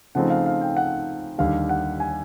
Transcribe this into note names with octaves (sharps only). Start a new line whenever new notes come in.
C#3 F3 A3 C4 D#4 F#5
F5
F5
G5
F#5
D#2 D3 G3 F5
F#5
G#5